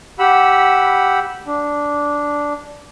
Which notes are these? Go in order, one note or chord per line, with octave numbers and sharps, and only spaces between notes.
G4 F#5 B5 E6
D4